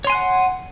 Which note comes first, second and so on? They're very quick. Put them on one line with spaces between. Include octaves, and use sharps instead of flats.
C#5 C6 G#5 F#6 F#5